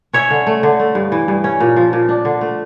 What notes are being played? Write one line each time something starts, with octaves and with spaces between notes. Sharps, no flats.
C#4 C#5 E5
D3
A3
D3
A3
G2
E3
G2
C#4
A#2
F3
A#2
D4
D3
A3